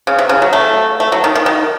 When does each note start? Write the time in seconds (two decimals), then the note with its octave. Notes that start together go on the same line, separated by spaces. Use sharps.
0.07 C#3
0.19 C3
0.29 C#3
0.42 F#3
0.53 A3
1.00 A3
1.12 F#3
1.24 D#3
1.35 D#3
1.46 D#3